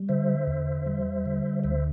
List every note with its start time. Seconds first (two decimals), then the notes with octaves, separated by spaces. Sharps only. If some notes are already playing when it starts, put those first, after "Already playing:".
Already playing: G3
0.09 D3 C5 E5
0.48 E2
0.86 G3
1.26 D3
1.64 D2 C5 E5